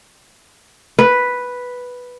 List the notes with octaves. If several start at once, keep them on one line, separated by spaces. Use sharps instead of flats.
B4